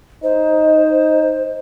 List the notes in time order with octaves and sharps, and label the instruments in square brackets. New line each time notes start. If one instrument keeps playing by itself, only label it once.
[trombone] D#4 [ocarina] C5